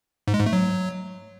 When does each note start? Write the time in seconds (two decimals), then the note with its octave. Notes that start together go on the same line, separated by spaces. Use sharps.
0.28 G#2
0.34 G#3
0.40 G#2
0.46 A3
0.53 F#3